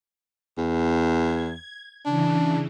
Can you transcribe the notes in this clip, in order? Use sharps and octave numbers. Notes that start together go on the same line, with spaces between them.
E2
G#6
C#3 E3 D4